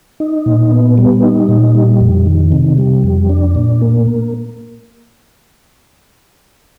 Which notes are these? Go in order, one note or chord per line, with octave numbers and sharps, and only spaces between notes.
D#4
A#2
B3
G3
D#4
A#2
G3
F2
D#3
C3
G3
F2
D4
A#2
A#3